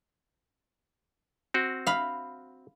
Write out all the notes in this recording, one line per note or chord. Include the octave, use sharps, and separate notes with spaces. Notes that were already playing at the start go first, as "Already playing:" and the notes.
C4 F#4
F5 B5